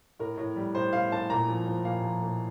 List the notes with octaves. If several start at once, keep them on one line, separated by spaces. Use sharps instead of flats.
A2 A#4
A2
G3
A2 C5
A2 F5
A2 A5
A#2 A#5
F3
F3
A#2 F5
F3
A#2